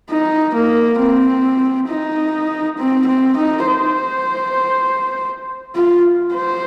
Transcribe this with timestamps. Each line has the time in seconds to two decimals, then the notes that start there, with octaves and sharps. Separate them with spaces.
0.10 D#4
0.55 A#3
1.00 C4
1.89 D#4
2.78 C4
3.07 C4
3.37 D#4
3.67 C5
5.76 F4
6.35 C5